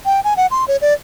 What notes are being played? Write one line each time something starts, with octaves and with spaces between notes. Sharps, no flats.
G5
G#5
F#5
C6
C#5
D5